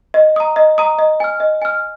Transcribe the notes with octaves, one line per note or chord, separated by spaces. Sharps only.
D#5
A#5 D#6
D#5
A#5 D#6
D#5
G#5 F6
D#5
G#5 F6